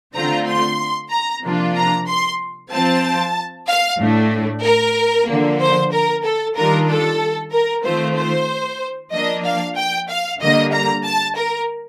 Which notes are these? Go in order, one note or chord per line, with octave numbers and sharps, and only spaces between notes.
D3 A3 C4 F4 A#5
C6
A#5
C3 F3 A#3 D4 F4
A#5
C6
F3 C4 F4 A5
F5
A2 A3 D4
A#4
D3 F3 A#3
C5
A#4
A4
D#3 G3 D4 F4 A#4
A4
A#4
D#3 A3 C4 F4 C5
C5
F3 A#3 D4 D#5
F5
G5
F5
D3 G3 A#3 D#5
A#5
A5
A#4